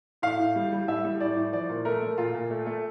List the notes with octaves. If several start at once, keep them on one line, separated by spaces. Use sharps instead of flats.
A2 F5
A2
G3
G3
A2 E5
G3
A2 D5
A2
F3 D5
A#2
A3 A#4
A3
A#2 F4
A#2
A3
A3